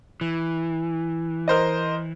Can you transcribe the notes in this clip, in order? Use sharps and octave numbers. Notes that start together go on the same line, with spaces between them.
E3
A#4 C5 D#5